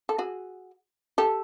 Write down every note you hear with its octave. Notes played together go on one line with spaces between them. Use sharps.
A4
F#4 G#4
G4 A4